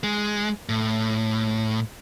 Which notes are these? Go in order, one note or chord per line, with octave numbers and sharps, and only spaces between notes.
G#3
A2